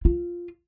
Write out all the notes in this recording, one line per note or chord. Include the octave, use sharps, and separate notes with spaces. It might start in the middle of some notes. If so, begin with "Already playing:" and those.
F4